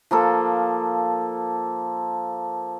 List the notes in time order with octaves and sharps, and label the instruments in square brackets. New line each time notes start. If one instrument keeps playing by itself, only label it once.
[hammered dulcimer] F3 A#3 A4